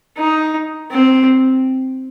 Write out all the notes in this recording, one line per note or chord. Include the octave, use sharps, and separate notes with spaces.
D#4
C4